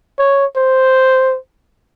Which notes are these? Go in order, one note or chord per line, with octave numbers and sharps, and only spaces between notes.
C#5
C5